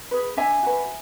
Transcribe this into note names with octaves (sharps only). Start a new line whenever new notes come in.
G#4 B4
D4 E5 G#5
F#4 B4